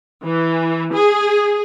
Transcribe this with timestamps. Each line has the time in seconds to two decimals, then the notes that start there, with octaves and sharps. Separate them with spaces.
0.24 E3
0.93 G#4